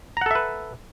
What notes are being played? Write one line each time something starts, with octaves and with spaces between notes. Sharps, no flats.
A4 B4 E5 F#5 A#5